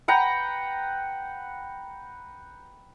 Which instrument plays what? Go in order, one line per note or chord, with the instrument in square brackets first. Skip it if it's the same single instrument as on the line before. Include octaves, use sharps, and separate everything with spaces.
[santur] B4 F#5 G5 A#5